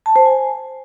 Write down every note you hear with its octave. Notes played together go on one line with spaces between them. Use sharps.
A5
C5
G#5